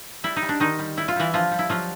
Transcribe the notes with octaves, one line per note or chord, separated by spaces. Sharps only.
G3 E4
D#4
G3
D4
D3 D#3 D#4
G3
G3 E4
F4
E3 G3 E4
D3 F3 F4
G3
E4
F3 F#3 F4